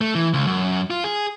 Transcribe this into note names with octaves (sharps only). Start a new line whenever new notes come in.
A3
E3
C#2
F#2
F4
G#4